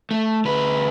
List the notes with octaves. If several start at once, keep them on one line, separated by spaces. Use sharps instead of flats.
A3
D2 B4